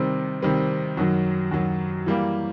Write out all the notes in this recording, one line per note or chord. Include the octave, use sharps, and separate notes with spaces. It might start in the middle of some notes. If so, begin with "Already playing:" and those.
Already playing: C3 D#3 G3 C4
C3 D#3 G3 C4
F#2 D#3 F#3
F#2 D#3 F#3
E3 G3 A#3